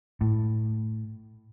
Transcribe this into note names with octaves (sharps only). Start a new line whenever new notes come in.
A2